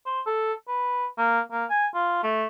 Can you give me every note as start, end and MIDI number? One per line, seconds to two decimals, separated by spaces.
0.06 0.21 72
0.26 0.53 69
0.68 1.06 71
1.18 1.39 58
1.51 1.65 58
1.69 1.87 80
1.94 2.19 65
2.23 2.46 57